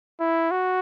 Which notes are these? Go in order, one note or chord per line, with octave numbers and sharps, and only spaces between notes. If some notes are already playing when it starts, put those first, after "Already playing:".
E4
F#4